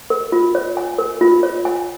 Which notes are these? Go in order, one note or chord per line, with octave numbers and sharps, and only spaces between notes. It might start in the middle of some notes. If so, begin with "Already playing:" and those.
A#4
F4
C#5
G#5
A#4
F4
C#5
G#5